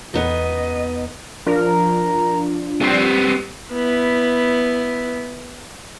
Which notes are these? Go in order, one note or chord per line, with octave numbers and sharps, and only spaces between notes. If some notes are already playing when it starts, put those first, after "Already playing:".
E2 B3 D#4 D#5
F3 D4 F4 A#4
G3 B3 C4
B3 E4